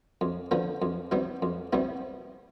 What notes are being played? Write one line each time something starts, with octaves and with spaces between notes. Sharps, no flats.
F2
D3 F3 B3
F2
C3 G3 B3 E4
F2
C3 G3 B3 E4